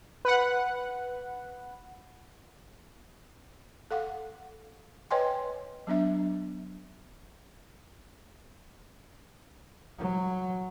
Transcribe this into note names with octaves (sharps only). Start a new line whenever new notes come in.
B4 F#5
A4 F5 F#5
B4 C#5 D#5 G5 G#5 C6
F#3 B3 D4 E5
F#3